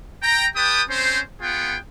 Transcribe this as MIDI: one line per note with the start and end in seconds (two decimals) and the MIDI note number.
0.23 0.46 79
0.23 0.46 82
0.56 0.82 67
0.56 0.82 71
0.56 0.82 79
0.56 0.82 81
0.56 0.82 87
0.89 1.21 60
0.89 1.21 61
0.89 1.21 72
1.41 1.77 59
1.41 1.77 65
1.41 1.77 68
1.41 1.77 78
1.41 1.77 79